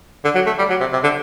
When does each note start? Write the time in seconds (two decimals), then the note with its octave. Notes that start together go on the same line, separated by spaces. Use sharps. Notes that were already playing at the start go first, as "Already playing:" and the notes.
0.24 D3
0.35 F#3
0.46 A3
0.59 G3
0.70 F#3
0.80 C3
0.93 C3
1.03 D3